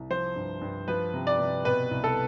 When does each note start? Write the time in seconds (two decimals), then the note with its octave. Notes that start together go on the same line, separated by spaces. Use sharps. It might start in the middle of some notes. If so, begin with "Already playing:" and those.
Already playing: C2
0.10 F3 C5
0.36 G2
0.61 G2
0.88 F3 B4
1.14 C3
1.27 D5
1.40 C3
1.65 B2 B4
1.91 C2
2.04 A4